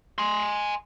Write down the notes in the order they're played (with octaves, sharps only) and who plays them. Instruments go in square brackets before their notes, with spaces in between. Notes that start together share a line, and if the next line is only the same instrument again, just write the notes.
[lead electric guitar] G#5 C6